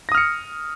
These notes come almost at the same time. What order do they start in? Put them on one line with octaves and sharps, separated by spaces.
A#6 D#6 F6 C#7